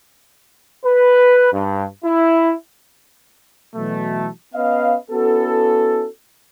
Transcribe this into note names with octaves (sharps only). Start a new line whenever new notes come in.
B4
G2
E4
B2 E3 F#3 A3
B3 C#4 B4 D#5 F5
B3 C#4 E4 F#4 A4